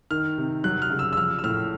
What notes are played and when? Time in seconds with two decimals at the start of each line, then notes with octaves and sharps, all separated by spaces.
0.11 D#3 F6
0.38 C3
0.64 F#3 F#6
0.82 F6
0.90 C#3
0.99 E6
1.13 E6
1.17 F3 F6
1.39 E6
1.44 A2 F6